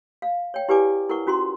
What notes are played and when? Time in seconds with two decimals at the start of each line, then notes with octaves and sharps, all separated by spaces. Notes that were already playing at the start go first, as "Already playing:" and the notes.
0.22 F5
0.54 C#5 G5
0.69 E4 G4 B4 D5 G#5 D6
1.09 E4 A#4 B4 F#5 C#6
1.27 C#4 F4 F#4 A#5 C6